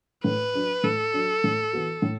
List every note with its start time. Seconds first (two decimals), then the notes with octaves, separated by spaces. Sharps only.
0.24 A2 B4
0.54 F#3 D4
0.84 A2 A4
1.13 F#3 D4
1.44 A2
1.73 E3 B3 F#4
2.02 A2